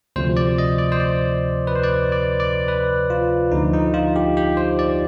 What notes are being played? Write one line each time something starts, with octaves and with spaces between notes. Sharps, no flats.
D2 C3 F3 C5
D5
D#5
D5
C5
D5
B4
C5
D5
D5
D5
B4
F4
D2 D3 F3 D#4
D#4
F4
G4
G4
C5
D5